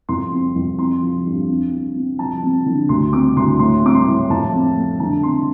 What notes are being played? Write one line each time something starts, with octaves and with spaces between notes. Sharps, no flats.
F2 C6
C4
F2
C4 C6
F3
G2
C4
C4
C4
F3 A5
C4
D3
D2 C6
C4 D6
D2 C6
A2 C6
C4 D6
C6
A2
F2 A5
C4
A3
D3 A5
C4 C6